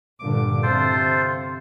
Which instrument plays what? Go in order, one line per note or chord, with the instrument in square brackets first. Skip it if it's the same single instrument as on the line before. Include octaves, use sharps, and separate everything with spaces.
[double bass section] G2 A#2 D3 [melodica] D6
[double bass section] C3 [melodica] F4 A4 C5